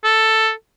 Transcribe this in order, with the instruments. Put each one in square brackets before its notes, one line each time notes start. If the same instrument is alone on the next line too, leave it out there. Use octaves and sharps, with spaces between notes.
[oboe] A4